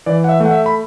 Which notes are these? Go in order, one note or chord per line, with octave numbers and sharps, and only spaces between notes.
E3 D5
F#5
E5
A3
F#5
E5
B5